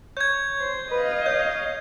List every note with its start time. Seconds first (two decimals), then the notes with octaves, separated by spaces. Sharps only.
0.17 C#5 G6 G#6
0.60 C5
0.91 B4 D#5 F5
1.26 C#5 G6